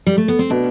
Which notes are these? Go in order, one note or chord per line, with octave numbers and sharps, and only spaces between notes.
G3
A3
B3
C4
B2 D4